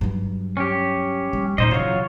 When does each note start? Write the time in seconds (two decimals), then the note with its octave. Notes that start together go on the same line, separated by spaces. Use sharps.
0.01 G2 F#3
0.57 C#4 G4
1.33 G3
1.58 D#2 A#2 D#4 C5 D#5
1.71 C#3 E3 F#3 F4 C#5